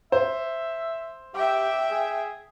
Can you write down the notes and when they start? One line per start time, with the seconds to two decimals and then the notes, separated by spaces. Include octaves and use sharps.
0.12 C5 E5
1.35 G4 E5 G5
1.91 G#4